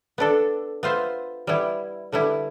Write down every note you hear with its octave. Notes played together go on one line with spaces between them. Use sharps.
B3 D4 A4
B3 F4 C5 E5
G3 B3 E4
D3 G3 B3 E4